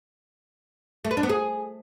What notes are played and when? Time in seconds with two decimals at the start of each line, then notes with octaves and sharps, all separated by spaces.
1.05 A3
1.11 B4
1.17 D4
1.23 B3
1.29 G#4